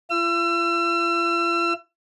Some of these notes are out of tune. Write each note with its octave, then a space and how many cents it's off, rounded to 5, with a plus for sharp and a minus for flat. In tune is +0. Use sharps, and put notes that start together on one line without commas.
F4 -45 E6 +35